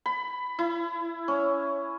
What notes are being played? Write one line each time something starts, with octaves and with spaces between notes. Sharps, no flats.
B5
E4
C#4